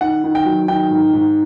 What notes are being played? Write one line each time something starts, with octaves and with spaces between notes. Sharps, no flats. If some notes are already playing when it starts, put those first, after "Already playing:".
D#3 F#5
D#3
G5
F#3
D#3 G5
G#2
G#2